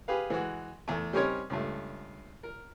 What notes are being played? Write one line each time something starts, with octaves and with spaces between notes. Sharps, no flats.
G4 G#4 B4 F5
E3 G#3 F#4
E2 A3
G3 C4 C#4 D#4 A#4 C#5
C#2 G2 A3
A#4